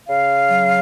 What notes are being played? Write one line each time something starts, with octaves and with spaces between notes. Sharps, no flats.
C#3 F5
F#3